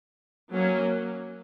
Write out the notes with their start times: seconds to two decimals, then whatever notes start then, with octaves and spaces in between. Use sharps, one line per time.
0.53 F#3 A#3 C#4